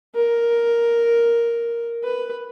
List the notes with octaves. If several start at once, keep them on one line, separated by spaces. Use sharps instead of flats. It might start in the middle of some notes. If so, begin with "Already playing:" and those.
A#4
B4